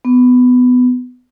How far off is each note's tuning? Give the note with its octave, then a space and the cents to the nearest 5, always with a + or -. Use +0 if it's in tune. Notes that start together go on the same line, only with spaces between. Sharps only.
B3 +15